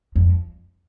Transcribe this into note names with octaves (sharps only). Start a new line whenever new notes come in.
F2